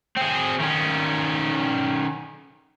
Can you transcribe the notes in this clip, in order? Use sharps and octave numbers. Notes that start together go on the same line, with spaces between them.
C4 G#4
D#3 C#4